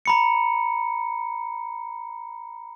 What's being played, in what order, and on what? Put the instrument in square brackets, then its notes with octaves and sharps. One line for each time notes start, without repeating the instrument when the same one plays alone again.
[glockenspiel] A#5 B5 C#7